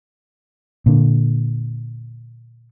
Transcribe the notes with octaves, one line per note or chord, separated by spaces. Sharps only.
A#2 D3